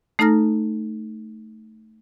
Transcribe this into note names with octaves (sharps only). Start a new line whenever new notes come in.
A3 D#4 A4 A#5 F6 A#6